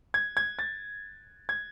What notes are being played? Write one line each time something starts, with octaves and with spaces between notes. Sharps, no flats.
G#6
G#6
A6
G#6